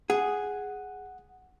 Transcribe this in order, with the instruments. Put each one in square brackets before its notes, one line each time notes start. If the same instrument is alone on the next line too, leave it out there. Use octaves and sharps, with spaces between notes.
[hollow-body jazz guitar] G#4 [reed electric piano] F#5